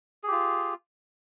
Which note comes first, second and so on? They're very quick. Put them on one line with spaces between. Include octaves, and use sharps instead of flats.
G#4 G4 F4